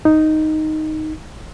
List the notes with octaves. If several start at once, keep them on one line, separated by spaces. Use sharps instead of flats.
D#4